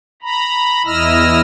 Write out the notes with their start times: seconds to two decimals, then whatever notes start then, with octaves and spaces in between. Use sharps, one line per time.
0.22 A#5 B5
0.86 E2 E4 D#5 E6 F6 A#6